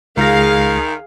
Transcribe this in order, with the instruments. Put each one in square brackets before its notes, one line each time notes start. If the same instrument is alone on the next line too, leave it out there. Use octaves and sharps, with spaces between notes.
[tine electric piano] C#2 A#6 [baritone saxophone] D#3 [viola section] G#4 F5